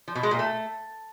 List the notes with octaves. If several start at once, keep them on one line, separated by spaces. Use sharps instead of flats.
F3
B2
G#3
A#2
A3